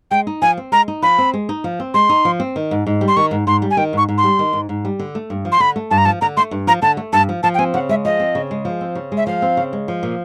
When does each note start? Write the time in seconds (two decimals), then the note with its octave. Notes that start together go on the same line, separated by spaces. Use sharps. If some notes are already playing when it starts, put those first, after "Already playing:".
0.11 G#3 G5
0.27 D#4
0.42 F3 G#5
0.57 C4
0.72 G#3 A#5
0.88 D#4
1.02 F3 B5
1.18 C4
1.34 G#3
1.49 D#4
1.64 F3
1.80 C4
1.94 G#3 C6
2.09 D#4
2.25 F3
2.40 C4
2.56 D#3
2.71 G#2
2.87 G#2
3.01 G3
3.08 C6
3.16 D#3 C#6
3.31 G#2
3.47 G#2 C6
3.62 G3
3.71 G#5
3.77 D#3 G5
3.93 G#2 C#6
4.08 G#2
4.18 C6
4.24 G3
4.39 D#3
4.53 G#2
4.69 G#2
4.85 G3
4.99 D3
5.15 A3
5.30 G2
5.45 F3
5.52 C6
5.60 D3 B5
5.76 A3
5.90 G2 A5
5.98 A#5
6.05 F3 A5
6.21 D3 A#5
6.37 A3 C6
6.51 G2
6.67 F3 A#5
6.82 D3 A5
6.97 A3
7.13 G2 A5
7.29 F3
7.43 F3 A5
7.54 G5
7.59 C4 G#5
7.74 C#3 F#5
7.89 G#3 E5
8.05 F3 D#5
8.20 C4
8.35 C#3
8.51 G#3
8.65 F3
8.81 C4
8.95 C#3
9.12 G#3
9.17 E5
9.27 F3 F5
9.42 C4
9.57 C#3
9.73 G#3
9.88 F3
10.03 A#2